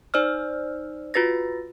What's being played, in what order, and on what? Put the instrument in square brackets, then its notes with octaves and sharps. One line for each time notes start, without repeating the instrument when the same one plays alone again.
[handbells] D#4 C5 D5 E6 F6
F4 F#4 B4 A6 A#6